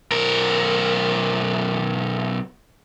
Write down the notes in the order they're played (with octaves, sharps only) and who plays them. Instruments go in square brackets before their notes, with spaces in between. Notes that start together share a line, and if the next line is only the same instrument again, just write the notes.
[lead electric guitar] B1 A#4